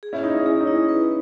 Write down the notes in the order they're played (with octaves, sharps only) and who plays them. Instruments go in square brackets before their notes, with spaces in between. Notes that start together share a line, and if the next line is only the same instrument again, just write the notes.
[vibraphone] G#4
[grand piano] C#4 E4
[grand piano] D#4 [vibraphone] E4
[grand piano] C#4
[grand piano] C#4 [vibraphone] G#4
[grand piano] D#4
[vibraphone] E4
[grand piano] C#4
[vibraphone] B4